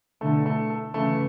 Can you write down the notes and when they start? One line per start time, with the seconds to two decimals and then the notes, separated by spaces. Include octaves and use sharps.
0.21 B2 D3 A3
0.46 A3
0.70 A4
0.94 C#3 E3 A3